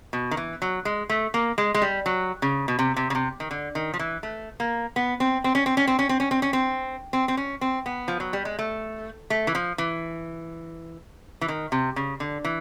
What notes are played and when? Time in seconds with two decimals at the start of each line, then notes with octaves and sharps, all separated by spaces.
0.13 B2
0.31 D#3
0.37 E3
0.62 F#3
0.85 G#3
1.09 A3
1.34 A#3
1.58 G#3
1.74 G#3
1.82 G3
2.06 F#3
2.42 C#3
2.68 B2
2.79 C3
2.96 C3
3.10 C#3
3.15 C3
3.40 D#3
3.51 D3
3.75 D#3
3.94 F3
3.99 E3
4.23 A3
4.60 A#3
4.96 B3
5.20 C4
5.44 C4
5.55 C#4
5.66 C4
5.77 C#4
5.87 C4
5.99 C#4
6.09 C4
6.20 C#4
6.31 C4
6.42 C#4
6.53 C4
7.13 C4
7.28 C4
7.37 C#4
7.61 C4
7.86 B3
8.08 F3
8.20 F#3
8.33 G3
8.45 G#3
8.59 A3
9.30 A3
9.47 E3
9.55 F3
9.78 E3
11.41 E3
11.48 D#3
11.72 C3
11.96 C#3
12.20 D3
12.45 E3